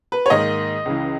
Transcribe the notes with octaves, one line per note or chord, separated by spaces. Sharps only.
B4
C#5
G#2 D#3 A#3 D#5
C#2 C#3 E3